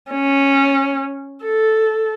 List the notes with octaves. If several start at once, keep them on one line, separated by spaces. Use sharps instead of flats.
C#4
A4